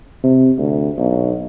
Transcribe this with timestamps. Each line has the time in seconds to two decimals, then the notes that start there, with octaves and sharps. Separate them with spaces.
0.24 C3
0.58 D2
0.98 B1